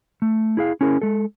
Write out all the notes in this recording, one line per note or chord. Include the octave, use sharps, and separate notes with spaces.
A3
E4 G#4 F5
C#4 E4 G#4 A#4
G#3 A4